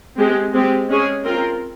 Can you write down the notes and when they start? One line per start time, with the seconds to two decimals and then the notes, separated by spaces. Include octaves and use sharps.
0.18 G#3 C4 G4
0.53 G#3 C4 G4
0.89 G#3 C#4 G#4 C#5
1.24 C4 F4 A#4